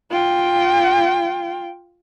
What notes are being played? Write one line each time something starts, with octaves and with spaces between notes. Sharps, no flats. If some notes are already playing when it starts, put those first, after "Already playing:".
F4 G5